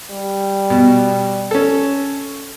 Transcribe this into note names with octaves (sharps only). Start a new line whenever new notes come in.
G3
B2
C#4 A4